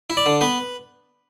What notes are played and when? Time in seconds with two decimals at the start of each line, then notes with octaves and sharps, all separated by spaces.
0.10 E4
0.17 D5
0.26 D3
0.41 B3 B4